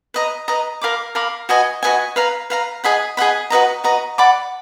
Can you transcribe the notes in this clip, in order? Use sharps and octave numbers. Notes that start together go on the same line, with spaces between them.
B4 D#5 A#5
B4 D#5 A#5
A#4 F5 B5 D6
A#4 F5 B5 D6
F#4 B4 D#5 G#5
F#4 B4 D#5 G#5
B4 F5 A#5
B4 F5 A#5
G#4 D#5 F#5 B5
G#4 D#5 F#5 B5
F#4 B4 D#5 A#5
F#4 B4 D#5 A#5
D5 F#5 B5 D6